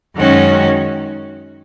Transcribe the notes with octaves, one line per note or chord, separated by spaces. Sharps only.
F#2 D#3 G#3 C#4 F#4